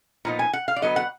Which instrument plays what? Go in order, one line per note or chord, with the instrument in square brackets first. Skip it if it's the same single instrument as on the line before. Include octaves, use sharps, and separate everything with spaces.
[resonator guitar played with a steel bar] A#2 F3 B3 D#4 A#5
G#5
F#5
F5
D5
D3 F#3 B3 D#5
F#5